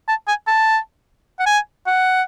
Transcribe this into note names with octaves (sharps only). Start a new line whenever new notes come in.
A5
G#5
A5
F#5
G#5
F#5